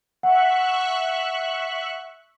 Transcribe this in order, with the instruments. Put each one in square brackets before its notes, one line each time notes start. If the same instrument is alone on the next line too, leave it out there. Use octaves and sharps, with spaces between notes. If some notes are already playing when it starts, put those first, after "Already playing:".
[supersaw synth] E5 C#6 F#6 [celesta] F#5